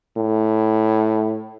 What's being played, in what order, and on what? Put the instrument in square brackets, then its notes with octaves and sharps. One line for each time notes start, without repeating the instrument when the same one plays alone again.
[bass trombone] A2